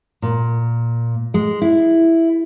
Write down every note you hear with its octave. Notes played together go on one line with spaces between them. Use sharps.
A#2
G#3
E4